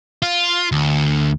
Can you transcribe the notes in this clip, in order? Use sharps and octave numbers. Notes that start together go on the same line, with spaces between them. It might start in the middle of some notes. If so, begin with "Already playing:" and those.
F4
D2